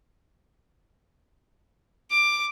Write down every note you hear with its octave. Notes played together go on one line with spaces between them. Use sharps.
D6